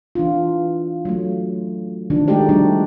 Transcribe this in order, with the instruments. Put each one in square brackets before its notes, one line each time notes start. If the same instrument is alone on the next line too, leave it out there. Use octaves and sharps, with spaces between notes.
[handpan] E3 D4 F4
F#3 A3
D#3 F3 D4
G#3 A3 D#4 F#4 G4 D5
F3 G3 A3 D4